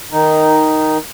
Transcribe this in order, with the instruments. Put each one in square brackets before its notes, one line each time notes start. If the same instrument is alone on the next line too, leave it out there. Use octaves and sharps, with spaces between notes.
[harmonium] D#3 D#4